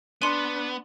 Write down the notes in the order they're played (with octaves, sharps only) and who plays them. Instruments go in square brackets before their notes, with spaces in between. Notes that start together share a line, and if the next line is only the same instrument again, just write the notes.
[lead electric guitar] B3 [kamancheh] D4 B5 [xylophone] C6 D#7